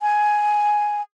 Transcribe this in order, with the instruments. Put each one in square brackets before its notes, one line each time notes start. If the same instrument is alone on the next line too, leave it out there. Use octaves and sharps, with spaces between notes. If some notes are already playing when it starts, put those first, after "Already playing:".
[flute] G#5